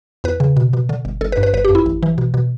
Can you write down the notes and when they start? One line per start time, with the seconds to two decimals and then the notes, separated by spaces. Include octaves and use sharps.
0.24 E2 B4
0.40 C#3
0.57 B2
0.73 B2
0.89 D3
1.05 G1
1.21 G1 A4
1.32 B4
1.37 G2
1.43 B4
1.54 G1 B4
1.65 G4
1.69 F#2
1.75 E4
1.86 A1
2.03 E3
2.18 B2
2.34 B2